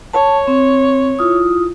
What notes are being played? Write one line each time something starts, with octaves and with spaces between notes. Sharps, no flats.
C#5 A5
C4
E4 F4 D#6